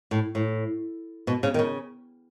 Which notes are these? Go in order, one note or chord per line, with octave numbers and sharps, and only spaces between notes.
A2
A2
B2
C#3
D#3
C#3